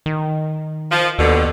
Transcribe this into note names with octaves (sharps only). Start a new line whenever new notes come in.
D#3
F3
D#2 B2 D3